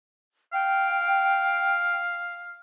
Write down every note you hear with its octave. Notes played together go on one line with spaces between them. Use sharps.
F5 G5